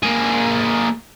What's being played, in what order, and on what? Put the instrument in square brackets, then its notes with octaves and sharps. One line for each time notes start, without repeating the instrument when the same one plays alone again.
[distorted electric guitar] A#3 G#4